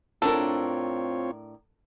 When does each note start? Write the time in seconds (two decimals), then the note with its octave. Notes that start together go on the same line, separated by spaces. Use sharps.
0.22 A2 C4 D4 F4 A4 A#4 C#5